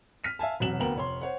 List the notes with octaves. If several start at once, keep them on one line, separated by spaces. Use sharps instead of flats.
F6 B6 D#7
E5 F5 G#5 A5
E1 C3 F#3 F#4 E7 F#7
D2 A#3 B3 G5 A#5 F#7
F1 C#5 C6
C5 C#5 F#5